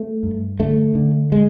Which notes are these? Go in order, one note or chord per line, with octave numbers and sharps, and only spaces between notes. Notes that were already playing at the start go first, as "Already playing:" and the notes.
Already playing: A3
G2
D3 A3
D3
G#3